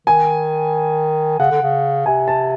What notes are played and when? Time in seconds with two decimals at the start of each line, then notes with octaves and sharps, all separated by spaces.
0.07 D#3 G#5
1.39 C#3 F#5
1.51 D3
1.62 C#3
2.06 C3 G#5
2.28 A5